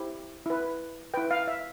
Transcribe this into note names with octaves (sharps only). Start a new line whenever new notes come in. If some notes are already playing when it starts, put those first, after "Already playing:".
Already playing: E4 G4 C5
E4 B4
E4 B4 G5
F5
E5